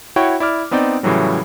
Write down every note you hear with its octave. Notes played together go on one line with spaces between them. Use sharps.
E4 F#4 C#5 G5 C#6
E4 D5 D6 F6
B3 C4 D#4 D5 G5
A2 C#3 E3 F#3 G3